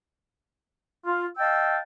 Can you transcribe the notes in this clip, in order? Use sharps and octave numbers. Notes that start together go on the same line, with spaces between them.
F4
D#5 F5 G5 A5 E6